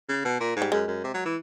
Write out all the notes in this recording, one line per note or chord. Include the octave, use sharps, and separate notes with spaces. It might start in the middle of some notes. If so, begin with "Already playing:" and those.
C#3
B2
A#2
G#2
G3
F#2 G#3
F#2
C3
F#3
E3